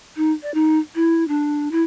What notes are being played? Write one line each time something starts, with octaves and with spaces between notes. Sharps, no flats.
D#4
D5
D#4
E4
D4
E4